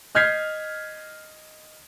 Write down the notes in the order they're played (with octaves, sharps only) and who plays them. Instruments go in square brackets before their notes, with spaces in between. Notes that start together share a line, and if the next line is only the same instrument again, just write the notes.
[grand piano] D#5 F6 G6 G#6 B6 C7